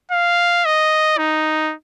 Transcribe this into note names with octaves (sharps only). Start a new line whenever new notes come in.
F5
D#5
D#4